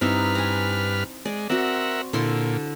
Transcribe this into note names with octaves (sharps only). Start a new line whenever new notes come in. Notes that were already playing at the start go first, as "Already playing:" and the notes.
G2 C4 D#4 E4 B4 F6
G#5 A#5
G#3 D5
C4 F#4 A#4 E5 F#5
A#2 D3 E4 C6